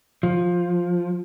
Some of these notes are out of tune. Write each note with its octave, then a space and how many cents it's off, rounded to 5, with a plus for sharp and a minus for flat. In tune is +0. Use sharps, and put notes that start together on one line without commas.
F3 +10